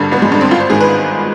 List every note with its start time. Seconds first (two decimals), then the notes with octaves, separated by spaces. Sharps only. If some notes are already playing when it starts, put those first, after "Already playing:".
Already playing: G#1 G2 D3
0.11 G#1 B3
0.22 G#3
0.32 G2 D3
0.41 C4
0.51 G#1 F4
0.60 C5
0.70 G#2 D#3 G#4
0.81 B4